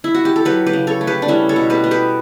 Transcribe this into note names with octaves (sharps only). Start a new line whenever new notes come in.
E4
F#4
G4
A4
F#3 G4 B4
G4 B4
C#3
A4 C#5
A3
G4 B4
D4
G3 C#4 E4
A4 C#5
B2
G4 B4
B3
G4 B4